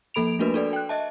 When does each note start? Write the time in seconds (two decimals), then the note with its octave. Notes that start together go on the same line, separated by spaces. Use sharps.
0.14 F3 A#3 A4 B5 D7 F7
0.39 A3 A#3 D4 F#4 A#4 B4
0.54 D4 A4 D5
0.73 G5 F#6
0.89 D#5 E5 A5